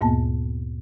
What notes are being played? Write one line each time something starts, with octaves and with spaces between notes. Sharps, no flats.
D2 G2 A#2 A#3 B3 A5